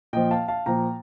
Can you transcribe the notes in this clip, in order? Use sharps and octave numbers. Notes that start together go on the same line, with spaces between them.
A#2 F3 D#5 G5
F5 A5
F5 A5
A#2 F3 G5 A#5